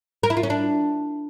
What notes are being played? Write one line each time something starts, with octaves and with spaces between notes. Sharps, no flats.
A#4
E4
F4
C#4
D4